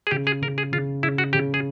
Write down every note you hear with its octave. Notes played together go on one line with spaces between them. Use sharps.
G#4
C#3 G4
G#4
C#3 A#4
G#4
C#3 F4
C#3 E4
F#4
C#3 G4
G#4